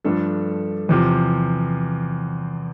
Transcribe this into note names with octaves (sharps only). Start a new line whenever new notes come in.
G2 F3 A3 D4 A4
E2 C3 F3